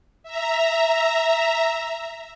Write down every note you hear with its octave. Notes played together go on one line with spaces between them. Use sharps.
E5 A#5